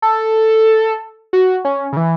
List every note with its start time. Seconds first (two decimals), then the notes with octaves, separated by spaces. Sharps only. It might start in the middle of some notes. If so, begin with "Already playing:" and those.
0.02 A4
1.33 F#4
1.65 C#4
1.93 C#3
1.97 E3